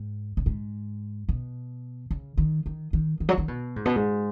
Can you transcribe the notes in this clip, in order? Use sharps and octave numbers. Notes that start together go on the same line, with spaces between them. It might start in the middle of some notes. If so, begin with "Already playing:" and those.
Already playing: G#2
B2
G#2
B2
C#3
D#3
D#3
D#3
D#3
F#3
D#3
B2
G#2
B2
G#2